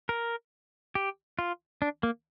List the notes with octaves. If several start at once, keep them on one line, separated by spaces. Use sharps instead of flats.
A#4
G4
F4
D4
A#3